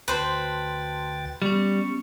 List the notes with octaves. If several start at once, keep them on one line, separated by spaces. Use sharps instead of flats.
D2 F#4 B4 C5 G5 A5 C6 A6
G3 B3 C#4 C#6